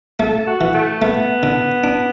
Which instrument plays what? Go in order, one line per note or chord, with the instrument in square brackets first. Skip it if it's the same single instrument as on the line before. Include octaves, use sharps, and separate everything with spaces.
[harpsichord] A3 [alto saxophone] A4
[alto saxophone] F#4
[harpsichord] E3
[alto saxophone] A3
[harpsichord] A3 [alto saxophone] B3
[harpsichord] D3
D4